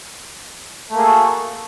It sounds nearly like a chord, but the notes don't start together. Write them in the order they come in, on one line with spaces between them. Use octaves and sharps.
A3 A#3 G#4 A4 F#4